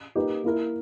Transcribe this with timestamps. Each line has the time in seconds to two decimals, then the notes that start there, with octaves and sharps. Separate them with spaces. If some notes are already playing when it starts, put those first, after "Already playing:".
0.15 A#3 D#4 G4 B4
0.44 A#3 E4 A#4